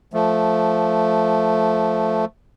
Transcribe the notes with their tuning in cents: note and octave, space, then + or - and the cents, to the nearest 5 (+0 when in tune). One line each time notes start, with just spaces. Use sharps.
F3 +0 A3 +0